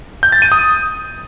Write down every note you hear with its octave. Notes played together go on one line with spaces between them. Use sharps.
G6
A6
D#7
D#6